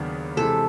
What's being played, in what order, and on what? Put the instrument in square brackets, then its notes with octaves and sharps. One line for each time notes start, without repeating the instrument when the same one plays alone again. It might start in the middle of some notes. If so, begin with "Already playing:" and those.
Already playing: [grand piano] D#2 C#3 F#3 B3 D4
[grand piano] C3 E3 G#3 [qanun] A4